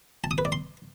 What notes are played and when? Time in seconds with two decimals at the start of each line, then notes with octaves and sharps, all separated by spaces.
0.24 A5
0.31 D#6
0.38 B4
0.45 D5
0.52 C6